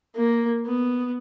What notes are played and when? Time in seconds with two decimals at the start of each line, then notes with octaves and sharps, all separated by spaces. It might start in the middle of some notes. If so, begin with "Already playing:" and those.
0.17 A#3
0.66 B3